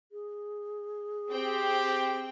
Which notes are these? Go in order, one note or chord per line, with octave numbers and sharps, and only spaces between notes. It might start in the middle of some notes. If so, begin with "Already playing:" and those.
G#4
C4 G4 G5